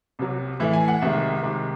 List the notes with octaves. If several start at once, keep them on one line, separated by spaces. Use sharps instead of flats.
C2 C3 F#3
A2 E3 A3 E5
G#5
F#5
C2 C3 D#3 G#3 E5
C2 C3 D#3 G#3